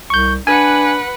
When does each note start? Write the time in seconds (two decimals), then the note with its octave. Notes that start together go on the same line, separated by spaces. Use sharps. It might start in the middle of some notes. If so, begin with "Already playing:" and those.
0.10 C2 C#6 G6
0.47 D4 B4 F#5 G#5